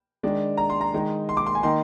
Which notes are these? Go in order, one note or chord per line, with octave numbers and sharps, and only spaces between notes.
D#3 G#3 D4
A#5
C6
A#5
D#3 G#3 D#4
C6
D6
C6
G#5
D#3 A#3 D#4 C6